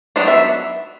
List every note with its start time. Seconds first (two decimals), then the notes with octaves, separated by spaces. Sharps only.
0.16 F#3 B3 D4 C5
0.28 E5